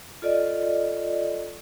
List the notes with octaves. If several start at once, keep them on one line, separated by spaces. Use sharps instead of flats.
F4 A4 D5 D#5